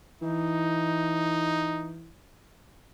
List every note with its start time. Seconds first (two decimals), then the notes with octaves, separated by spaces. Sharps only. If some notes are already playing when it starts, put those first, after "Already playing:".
0.21 E3 D#4